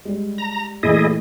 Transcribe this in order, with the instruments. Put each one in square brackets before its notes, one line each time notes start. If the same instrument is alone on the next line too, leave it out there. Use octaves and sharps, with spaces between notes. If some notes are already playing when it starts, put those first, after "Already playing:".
[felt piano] G3 G#3
[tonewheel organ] A#5
[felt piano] A#2 E3 A3 [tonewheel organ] E4 G#4 D#5